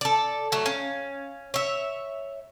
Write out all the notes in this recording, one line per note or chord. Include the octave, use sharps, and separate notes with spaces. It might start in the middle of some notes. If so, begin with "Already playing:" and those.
A4 D5
F#3 A3
C#4 F5
C#5 E5